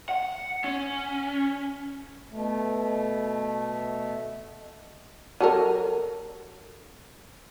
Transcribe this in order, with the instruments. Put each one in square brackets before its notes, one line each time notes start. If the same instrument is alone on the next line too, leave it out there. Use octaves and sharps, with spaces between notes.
[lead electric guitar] F#5
C#4
[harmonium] B2 A3
[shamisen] F#3 A4 A#4